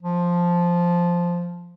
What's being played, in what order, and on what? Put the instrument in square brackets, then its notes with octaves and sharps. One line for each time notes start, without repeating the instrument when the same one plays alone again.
[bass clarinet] F3